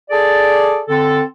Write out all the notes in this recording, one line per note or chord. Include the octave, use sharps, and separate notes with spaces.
G#4 A4 D5
D3 C4 A4